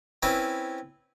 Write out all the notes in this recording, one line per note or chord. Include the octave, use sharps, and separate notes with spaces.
C4 C#4 E4 B4